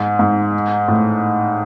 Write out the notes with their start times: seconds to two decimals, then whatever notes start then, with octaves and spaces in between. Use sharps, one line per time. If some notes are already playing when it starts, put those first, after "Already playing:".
Already playing: G#2
0.19 G#2
0.88 A2